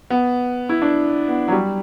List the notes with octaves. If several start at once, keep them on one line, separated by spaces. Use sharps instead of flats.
B3
E4
D4
B3
F#3
G3